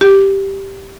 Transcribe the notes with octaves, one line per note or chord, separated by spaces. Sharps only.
G4